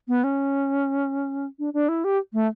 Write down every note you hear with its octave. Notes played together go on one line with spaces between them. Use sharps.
B3
C#4
D4
D4
E4
G4
A3